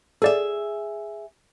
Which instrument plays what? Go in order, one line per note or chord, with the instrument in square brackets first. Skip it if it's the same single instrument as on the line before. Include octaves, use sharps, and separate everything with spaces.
[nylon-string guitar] G#4 E5 [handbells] A4 D5